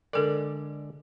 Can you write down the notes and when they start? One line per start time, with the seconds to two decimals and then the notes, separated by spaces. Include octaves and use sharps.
0.13 D3 G#3 A4 A#4 D5